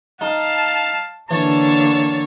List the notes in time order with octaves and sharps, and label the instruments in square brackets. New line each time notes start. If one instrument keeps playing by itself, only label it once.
[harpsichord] D#4 [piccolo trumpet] F5 [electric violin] A5
[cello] D3 A#3 [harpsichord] E3 [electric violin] C#5 A6 [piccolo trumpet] A5